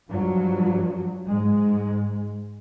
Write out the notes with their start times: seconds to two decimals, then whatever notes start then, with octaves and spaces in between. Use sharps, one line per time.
0.10 G2 F3 F#3
1.26 G#2 G#3